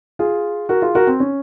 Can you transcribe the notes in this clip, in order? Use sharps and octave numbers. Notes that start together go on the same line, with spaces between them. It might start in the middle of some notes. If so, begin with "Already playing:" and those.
F4 G#4
F#4 A#4
F4 G#4
F#4 A#4
C4
C#4